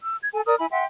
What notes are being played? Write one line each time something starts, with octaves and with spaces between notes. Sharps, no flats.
E6
G#6
A4 G#5
A#4 D5 D#6 F6
E4 G#5 B5
E5 F#5 G5 C6